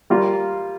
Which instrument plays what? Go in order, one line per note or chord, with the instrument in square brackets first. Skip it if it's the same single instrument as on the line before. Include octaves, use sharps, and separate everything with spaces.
[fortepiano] G3 A#3 F4